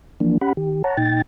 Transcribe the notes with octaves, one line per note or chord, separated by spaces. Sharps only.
E3 F3 A#3 D4
C#4 G4 F#5 B5
D#3 G4
C#5 F#5 A5 A#5
A#2 D#4 G5 A6